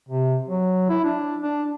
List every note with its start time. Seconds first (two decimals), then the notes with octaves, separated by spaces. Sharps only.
0.09 C3
0.48 F#3
0.89 E4
1.04 D4
1.43 D4